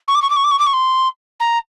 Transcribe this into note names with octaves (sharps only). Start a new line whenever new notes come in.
C#6
D6
C#6
D6
C#6
D6
C#6
D6
C#6
C6
A#5